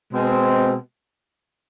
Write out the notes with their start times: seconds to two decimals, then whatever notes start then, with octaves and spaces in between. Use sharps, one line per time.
0.12 B2 G#3 C4